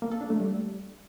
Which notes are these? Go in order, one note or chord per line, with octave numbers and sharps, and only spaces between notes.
A#3
A4
D4
A3
G3